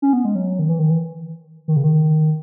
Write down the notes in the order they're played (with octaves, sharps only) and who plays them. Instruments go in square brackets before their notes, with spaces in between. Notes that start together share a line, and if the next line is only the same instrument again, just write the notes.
[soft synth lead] C#4
B3
G#3
F#3
D#3
E3
D#3
E3
D#3
C#3
D#3